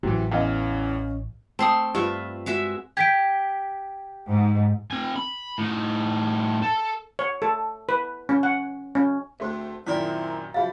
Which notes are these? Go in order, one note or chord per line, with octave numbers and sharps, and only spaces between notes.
A1 C3 E3 F#3
E2 E3 C#4 D#5 F5
A3 C4 A5 C6 D#6
G2 F4 B4 E5
G#3 F#4 E5
G4 G#6 B6 D7
G#2
C4 G#5
B5
A2 D#4
A4
C#5
A4
B4
C#4
F#5
C#4
D2 A3 C4 G#4 C5 C6
F#2 A#2 D#3 C4 E4 A#4 D5 B5
C#3 F3 F#3 G#4 E5 F5 B5 A6